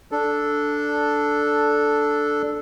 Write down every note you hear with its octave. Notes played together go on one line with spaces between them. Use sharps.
D4 A4